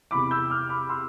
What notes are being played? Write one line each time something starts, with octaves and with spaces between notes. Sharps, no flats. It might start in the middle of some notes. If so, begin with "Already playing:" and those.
E2 C3 E3 B5 D6
E6 G6
D6 F6
B5 D6
C6 E6